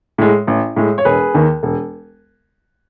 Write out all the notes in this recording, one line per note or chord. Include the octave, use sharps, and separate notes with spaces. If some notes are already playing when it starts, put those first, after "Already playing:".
A2 G#3
A1
A2 G#3
C#5
E1 G#4 B4
D#2 D#3
E1